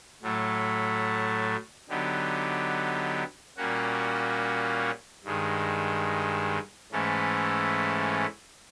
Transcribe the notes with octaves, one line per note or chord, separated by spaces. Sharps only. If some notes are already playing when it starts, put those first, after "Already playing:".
A2 F#3 A3
D3 F#3 B3 D#4 G4
A#2 G3 A#3 C#4 F#4
G2 D#3 G#3
G#2 E3 A3 C#4